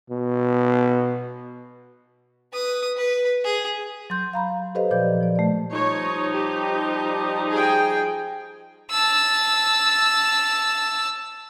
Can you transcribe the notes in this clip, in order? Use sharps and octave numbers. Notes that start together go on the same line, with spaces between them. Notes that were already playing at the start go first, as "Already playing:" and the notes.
B2
B4 D#6
B4
G#4
F#3 C6 G6
F5 A#5 B5
G4 A4 B4 C5 D#5 F5
A#2 F3 C5 D5 G6
F3 D5
A3 D5
F3 G3 D#4 C#5
G4
G#4 G5
A5 E6